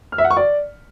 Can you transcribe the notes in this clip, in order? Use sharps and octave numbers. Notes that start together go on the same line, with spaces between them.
F6
E5
F#5
C#6
D5